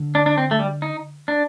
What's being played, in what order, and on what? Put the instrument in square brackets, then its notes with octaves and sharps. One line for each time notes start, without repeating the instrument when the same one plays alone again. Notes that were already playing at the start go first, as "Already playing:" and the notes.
Already playing: [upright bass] D3
[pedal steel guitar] D4
D4
C4
A3
G3
D#4
D4